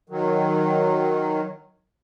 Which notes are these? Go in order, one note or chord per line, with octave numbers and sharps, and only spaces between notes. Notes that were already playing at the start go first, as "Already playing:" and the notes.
D#3 F#3